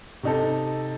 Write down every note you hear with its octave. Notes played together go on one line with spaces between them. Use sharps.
C3 D#4 A4